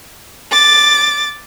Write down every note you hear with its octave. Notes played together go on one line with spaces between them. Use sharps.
D6 A6